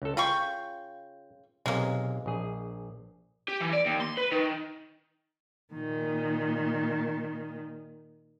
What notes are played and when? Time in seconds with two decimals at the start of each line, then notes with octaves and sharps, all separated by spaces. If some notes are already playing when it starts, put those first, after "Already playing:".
0.02 C#2 A4
0.17 C#3 F4 G5 C#6
1.66 B1 C3 G#3 A#3
2.26 A#1 G#4
3.48 G4
3.60 E3
3.73 D5
3.86 D#2
4.01 C6
4.17 B4
4.32 D#3
5.73 A#2 D#3